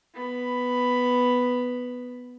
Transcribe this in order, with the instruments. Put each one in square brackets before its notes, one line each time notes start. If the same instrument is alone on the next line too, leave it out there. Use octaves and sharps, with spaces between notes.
[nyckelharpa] B3 B5